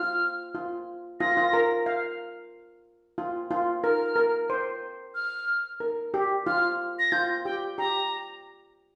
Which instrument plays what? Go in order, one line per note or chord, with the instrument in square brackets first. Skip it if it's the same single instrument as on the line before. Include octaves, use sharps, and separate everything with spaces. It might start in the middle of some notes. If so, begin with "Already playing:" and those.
Already playing: [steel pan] F4 [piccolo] F6
[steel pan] F4
[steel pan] F4 [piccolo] A#6
[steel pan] F4
A#4
F5
F4
F4
[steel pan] A#4 [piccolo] F6
[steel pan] A#4
C5
[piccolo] F6
[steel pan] A#4
G4
[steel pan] F4 [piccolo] F6
[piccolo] A#6
[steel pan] F4 [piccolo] G6
[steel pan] G4 [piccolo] G5
[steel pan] G4 [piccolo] A#5